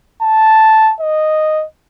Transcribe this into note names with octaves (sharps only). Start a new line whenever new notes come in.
A5
D#5